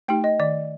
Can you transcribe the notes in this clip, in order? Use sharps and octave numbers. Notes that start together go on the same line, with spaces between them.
A3 D#4 G4 G5
D#5
D#3 D5